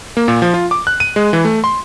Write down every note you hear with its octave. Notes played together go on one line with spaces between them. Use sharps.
A#3
A#2
F3
F4
D6
F#6
D#7
G#3
E3
A3
C6